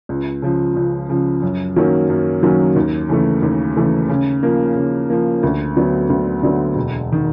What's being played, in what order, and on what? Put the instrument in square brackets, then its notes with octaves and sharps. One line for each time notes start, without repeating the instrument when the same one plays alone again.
[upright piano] C#2
C#3 F3
C#2
C#3 F3
F#2
D#3 F#3 A#3 C#4
F#2
D#3 F#3 A#3 C#4
D#2
C#3 E3 A3
D#2
C#3 E3 A3
C#3
F3 A#3
C#3
F3 A#3
D2
D3 F#3 B3
D2
D3 F#3 B3
E1
D#3